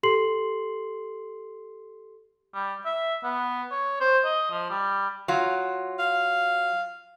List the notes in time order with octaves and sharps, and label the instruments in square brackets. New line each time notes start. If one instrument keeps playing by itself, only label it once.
[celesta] G4 A4 C6 C7 F#7
[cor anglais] G3
E5
B3
C#5
C5
D#5
F3
G3
[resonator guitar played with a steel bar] F#3 F4
[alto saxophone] F5